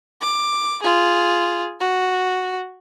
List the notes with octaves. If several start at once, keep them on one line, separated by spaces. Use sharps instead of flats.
D6
F4 G#4
F#4